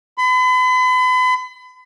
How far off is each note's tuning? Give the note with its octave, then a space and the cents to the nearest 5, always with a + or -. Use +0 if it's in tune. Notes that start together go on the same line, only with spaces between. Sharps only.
B5 +40